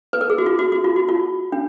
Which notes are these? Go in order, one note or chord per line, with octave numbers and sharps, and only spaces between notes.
B4
A#4
G#4
F#4
F4
F#4
F#4
F4
F#4
F4
D4